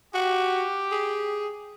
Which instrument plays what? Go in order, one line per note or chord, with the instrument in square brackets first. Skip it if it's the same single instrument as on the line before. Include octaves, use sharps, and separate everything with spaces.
[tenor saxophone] F#4 [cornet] G4
[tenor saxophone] G#4